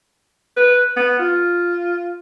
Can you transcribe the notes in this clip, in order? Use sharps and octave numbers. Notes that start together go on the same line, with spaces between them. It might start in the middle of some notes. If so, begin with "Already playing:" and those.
B4
B3
F4